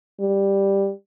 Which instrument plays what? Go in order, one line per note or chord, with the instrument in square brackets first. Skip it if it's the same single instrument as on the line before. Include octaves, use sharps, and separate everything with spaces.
[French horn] G3